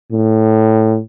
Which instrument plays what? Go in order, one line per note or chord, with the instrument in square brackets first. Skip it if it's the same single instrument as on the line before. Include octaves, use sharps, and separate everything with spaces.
[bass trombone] A2